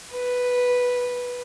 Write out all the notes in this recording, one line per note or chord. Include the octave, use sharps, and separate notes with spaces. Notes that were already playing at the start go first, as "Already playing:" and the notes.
B4